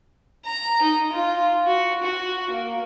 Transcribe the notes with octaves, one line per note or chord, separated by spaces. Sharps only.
A#5
D#4
F4
F#4
F#4
A#3